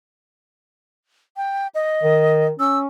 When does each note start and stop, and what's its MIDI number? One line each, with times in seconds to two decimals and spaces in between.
1.37 1.67 79
1.75 2.47 75
2.03 2.50 51
2.60 2.88 61
2.60 2.78 88